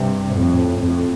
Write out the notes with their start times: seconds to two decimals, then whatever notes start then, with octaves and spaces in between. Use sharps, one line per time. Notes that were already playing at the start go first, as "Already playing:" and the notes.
Already playing: G2 C3
0.35 F2 A2
0.81 F2 A2